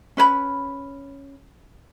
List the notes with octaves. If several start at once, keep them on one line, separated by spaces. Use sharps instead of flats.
C#4 B4 C5 B5